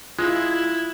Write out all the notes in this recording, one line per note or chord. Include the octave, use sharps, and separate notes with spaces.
G#3 E4 F4